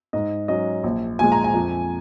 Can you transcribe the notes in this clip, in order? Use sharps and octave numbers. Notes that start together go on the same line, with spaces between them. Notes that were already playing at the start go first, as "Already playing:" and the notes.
G#2 D#5
F#3 C#4 D#5
A#1
A#2 F3 G#3 G#5
A#5
G#5
F2